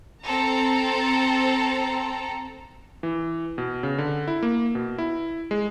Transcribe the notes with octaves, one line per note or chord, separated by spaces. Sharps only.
C4 A4 A#5
E3
B2
C#3
D3
E4
A#3
B2
E4
G#3